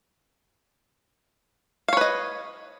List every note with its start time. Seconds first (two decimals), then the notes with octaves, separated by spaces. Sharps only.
1.88 F5
1.93 C#5
1.97 B4
2.01 D#5